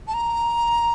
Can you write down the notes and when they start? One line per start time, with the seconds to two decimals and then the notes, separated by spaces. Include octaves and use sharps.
0.08 A5
0.14 A#5